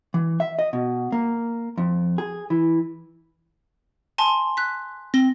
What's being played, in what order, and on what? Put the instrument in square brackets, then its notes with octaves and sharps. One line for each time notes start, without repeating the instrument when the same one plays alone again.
[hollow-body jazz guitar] E3
E5
D#5
B2
A#3
F2
G#4
E3
[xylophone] G#5 A5 C6
F#6 B6
[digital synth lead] C4 [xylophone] A#6 G7